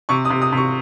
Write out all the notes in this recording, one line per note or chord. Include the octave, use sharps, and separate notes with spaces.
C3 C#6
D#6
C3
D#6
C3 C#6